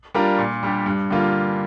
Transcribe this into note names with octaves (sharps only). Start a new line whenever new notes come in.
G3 D4 F4 A#4
A#2
G3 D4 G4
G2
D3 G3 A#3 F4